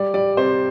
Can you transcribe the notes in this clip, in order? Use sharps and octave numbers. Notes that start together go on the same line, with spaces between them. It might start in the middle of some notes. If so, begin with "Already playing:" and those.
Already playing: G3 D5
G3 D5
C3 C5